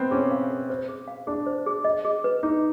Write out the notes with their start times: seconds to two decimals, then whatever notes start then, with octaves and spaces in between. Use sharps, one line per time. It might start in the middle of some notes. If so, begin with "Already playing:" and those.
Already playing: B3 C4
0.11 C#4 G#4
0.31 F5
0.50 G#4
0.70 C5
0.88 G#4
1.08 F5
1.27 D4 G#4
1.47 C5
1.66 G#4
1.85 D#5
2.05 G#4
2.24 B4
2.43 D#4 G#4